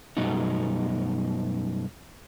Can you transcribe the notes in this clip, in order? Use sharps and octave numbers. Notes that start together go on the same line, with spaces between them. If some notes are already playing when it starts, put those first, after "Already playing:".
F#2 B2 G3 A3 B3 D#4